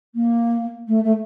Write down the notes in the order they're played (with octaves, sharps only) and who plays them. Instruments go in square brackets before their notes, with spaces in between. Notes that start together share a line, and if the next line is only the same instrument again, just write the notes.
[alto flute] A#3
A3
A3